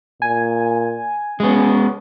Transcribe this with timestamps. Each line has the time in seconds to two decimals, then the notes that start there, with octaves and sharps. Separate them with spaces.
0.22 A#2 G#5
1.40 G#3 B3 C#4